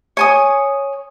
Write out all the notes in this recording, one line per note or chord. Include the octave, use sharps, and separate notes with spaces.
C#5 G#5 D#6